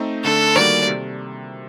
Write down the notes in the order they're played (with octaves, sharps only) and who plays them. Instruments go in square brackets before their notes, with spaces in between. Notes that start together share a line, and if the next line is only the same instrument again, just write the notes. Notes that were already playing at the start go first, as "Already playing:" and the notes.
Already playing: [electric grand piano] A3 C4 D#4
[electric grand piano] D3 A3 D4 [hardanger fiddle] A4
[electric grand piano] D#3 G3 A#3 F#4 A#4 [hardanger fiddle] D5
[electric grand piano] C3